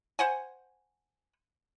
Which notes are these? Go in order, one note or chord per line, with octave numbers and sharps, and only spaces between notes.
C5 F#5 G#5